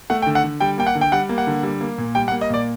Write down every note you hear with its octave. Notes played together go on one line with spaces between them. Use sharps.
A3 F#5
G5
D3
F#5
D3
G3 G5
A#3 G5
F#5
D3
G5
G3 F#5
A#3
F#5
D3
G3
A#3
A#2
G3 G5
F#5
A#3
D#5
A#2 D5